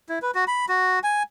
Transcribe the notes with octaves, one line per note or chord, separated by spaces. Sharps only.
E4
B4
F#4
B5
F#4
G#5